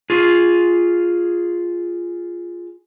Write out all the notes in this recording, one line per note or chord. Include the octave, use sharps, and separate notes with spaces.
F4 G#4